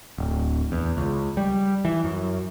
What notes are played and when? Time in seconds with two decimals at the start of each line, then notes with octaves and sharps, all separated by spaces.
0.18 D1
0.72 E2
0.97 C#2
1.37 G3
1.85 E3
2.04 F#2